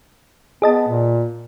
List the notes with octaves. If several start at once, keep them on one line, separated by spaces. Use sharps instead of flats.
B3 G#4 D#5 A5
A#2